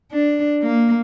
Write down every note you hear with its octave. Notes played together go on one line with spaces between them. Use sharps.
D4
A#3